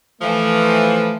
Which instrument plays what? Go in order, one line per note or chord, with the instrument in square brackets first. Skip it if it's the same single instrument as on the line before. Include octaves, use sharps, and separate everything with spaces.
[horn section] E3 F3 [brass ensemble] A3